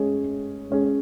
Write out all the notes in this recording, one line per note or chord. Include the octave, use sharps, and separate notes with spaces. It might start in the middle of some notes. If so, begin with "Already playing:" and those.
Already playing: G#3 C#4 G#4
G#3 C#4 G#4